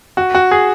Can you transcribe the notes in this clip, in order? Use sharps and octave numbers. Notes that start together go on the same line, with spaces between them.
F#4
F#4
G#4